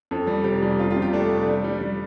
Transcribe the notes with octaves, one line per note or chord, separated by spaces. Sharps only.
F2 A4
G3
F1 G4
G3
F2 F4
F4
C3
G4
A3 D4
A3
G3 D4
G3
G3